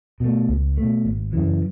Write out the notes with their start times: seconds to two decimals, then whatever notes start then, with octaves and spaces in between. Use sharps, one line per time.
0.20 B2 A3
0.48 C#2
0.77 B2 A3
1.05 G#1
1.33 F#2 C#3 E3